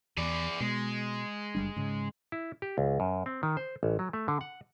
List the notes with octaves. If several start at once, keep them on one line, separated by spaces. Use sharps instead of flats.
E2 G#4 D5
B2 G#3
F#1 G3 D4
G#2 C#3
E4
G4
C#2
F#2
C4
D#3
C5
A1
F#3
A3
D3
F#5